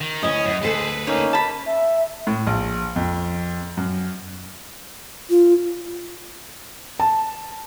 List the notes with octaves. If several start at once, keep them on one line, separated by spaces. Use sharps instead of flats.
D#3
D2 C#4 E4 C#5 D#5
F#2
D2 G#4 A4 B4 C5 A5
A#3 C#4 D#4 C#5
A5 B5
E5
A2
A#1
F2
F#2
F4
A5